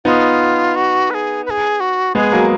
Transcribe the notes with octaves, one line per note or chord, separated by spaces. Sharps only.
B3 D#4 F4
F#4
B4
G#4
B4
G#4
F#4
G#3 B3 G#4
F#3 A#3